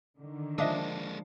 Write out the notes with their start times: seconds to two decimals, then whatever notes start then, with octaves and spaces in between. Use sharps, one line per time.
0.20 D3 D#3
0.58 F3 G#3 A#3 D4 D#5 E5 D#6